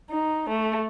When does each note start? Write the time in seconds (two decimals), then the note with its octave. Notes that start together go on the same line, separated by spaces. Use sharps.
0.11 D#4
0.50 A3